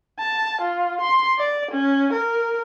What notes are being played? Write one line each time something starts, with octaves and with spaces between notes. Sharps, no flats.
A5
F4
C6
D5
C#4
A#4